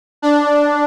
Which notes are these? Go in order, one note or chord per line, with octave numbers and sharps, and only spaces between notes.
D4